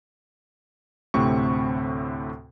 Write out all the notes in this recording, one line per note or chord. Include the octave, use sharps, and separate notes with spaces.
D2 A2 C3 C4 C#6